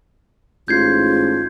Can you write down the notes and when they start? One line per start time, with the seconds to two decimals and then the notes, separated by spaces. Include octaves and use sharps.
0.68 A1 G#2 F4 G6 G#6 C7